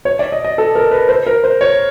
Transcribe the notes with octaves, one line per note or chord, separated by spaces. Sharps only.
C#5
D5
D#5
D#5
A4
A#4
B4
C5
A#4
C5
C#5